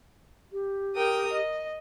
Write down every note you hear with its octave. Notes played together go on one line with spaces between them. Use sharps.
G4
A#4 G5 D#6
D#5